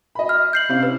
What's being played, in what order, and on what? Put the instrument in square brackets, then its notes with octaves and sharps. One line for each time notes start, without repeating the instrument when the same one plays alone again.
[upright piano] D#5 B5
[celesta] F6
G6 C7 F#7
[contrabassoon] C3 [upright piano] C#4 E4 F5
[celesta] B4